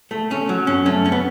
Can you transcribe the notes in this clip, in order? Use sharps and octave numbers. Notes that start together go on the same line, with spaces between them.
A3
A3 C#4
F#3
F#2 C#4
A3 C#4
F#2 C#4
B3